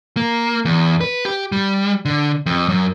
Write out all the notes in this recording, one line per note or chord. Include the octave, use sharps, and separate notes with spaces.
A#3
E2
B4
G4
G3
D3
F2
F#2